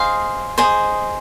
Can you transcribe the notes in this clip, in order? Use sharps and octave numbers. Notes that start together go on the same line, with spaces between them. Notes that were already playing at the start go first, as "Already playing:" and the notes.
Already playing: G#4 C5 D#5 F5
G#4 C5 D#5